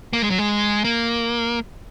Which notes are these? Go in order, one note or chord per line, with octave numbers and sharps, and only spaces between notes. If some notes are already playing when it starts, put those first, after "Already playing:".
A#3
G#3
F#3
G#3
A#3